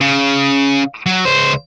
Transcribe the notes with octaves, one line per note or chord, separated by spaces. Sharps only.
C#3
F#3
C#2 C5